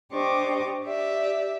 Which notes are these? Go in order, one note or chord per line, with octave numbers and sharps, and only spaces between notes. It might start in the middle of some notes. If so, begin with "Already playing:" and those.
D4 G4 C5 D#5 C#6 D6
G4 D5 E5